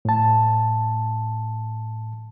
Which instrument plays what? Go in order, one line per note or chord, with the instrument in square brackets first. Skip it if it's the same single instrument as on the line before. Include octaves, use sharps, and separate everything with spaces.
[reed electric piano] A2 A5